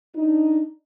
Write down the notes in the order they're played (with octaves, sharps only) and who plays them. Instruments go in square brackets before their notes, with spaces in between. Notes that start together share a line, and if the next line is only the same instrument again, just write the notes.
[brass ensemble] D4 D#4